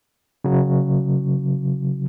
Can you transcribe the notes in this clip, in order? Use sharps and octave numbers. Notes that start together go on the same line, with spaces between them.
C#3 F#3